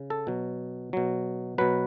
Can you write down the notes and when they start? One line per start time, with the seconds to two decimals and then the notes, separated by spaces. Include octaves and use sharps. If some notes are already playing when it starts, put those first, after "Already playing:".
Already playing: C#3
0.10 A4
0.27 B2 F#3
0.93 B2 F#3
1.58 B2 F#3 B4